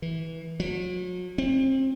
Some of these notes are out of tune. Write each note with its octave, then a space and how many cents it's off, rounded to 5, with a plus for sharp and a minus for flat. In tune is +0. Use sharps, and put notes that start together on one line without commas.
E3 -15
F#3 -40
C4 +30